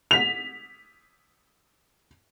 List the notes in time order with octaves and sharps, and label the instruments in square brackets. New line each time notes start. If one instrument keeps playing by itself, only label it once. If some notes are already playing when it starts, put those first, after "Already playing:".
[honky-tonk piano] B6 F7